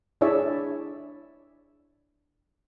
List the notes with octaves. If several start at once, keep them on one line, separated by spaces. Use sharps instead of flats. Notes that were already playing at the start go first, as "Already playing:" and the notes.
D4 E4 G#4 C#5 D5 E5